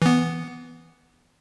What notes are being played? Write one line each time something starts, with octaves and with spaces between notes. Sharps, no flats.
E3 B3